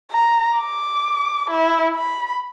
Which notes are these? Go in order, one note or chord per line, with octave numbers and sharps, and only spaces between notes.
A#5
D6
E4
B5